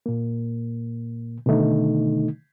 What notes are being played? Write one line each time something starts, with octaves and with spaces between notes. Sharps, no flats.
A#2 A#3
B2 D3 D#3 A3 D#4